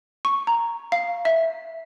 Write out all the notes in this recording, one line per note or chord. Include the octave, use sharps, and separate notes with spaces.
C#6
A#5
F5
E5